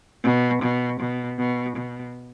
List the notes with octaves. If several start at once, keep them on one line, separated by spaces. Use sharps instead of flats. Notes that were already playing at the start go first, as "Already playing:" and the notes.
B2
B2
B2
B2
B2